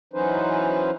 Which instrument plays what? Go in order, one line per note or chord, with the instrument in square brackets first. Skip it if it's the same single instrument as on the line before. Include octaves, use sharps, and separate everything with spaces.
[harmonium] E3 F#3 C#4 D#4 B4 C5